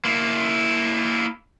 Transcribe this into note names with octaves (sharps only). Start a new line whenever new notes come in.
A#3 E4